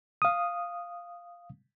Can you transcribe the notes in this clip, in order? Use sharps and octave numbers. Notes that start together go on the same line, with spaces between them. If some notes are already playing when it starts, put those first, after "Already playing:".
F5 D#6